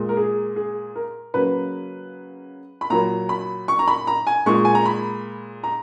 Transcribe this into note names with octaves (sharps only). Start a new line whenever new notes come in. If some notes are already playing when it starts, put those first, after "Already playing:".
Already playing: A#2 G#3
A#4
G#4
G#4
A#4
C#3 F#3 A#3 B4
B5
A#2 F#3 A#3 A#5
B5
C#6
A#5
B5
A#5
G#5
A#2 G#3 C#6
G#5
A#5
B5
A#5